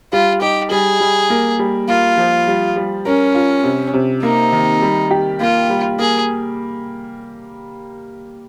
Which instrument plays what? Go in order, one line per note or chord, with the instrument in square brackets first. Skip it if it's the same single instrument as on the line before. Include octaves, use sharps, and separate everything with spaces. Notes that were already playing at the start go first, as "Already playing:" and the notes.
[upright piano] G3 [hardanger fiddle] F4
[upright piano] D#4 [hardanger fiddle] G4
[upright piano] G3 [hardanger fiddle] G#4
[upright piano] G3
A#3
G3
[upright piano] A#3 [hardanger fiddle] F4
[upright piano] F3
G3
G3
[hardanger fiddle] C#4 [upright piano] A#4
[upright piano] F4
C3
C3
[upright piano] A#3 [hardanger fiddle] D#4
[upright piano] D#3
G3
G4
[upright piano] A#3 [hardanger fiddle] F4
[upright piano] G3
[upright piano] A#3 [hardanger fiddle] G#4